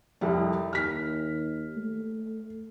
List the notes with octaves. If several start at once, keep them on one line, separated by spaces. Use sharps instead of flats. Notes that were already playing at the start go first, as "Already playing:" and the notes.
C2 F2 G3
D#2 F6 B6
A3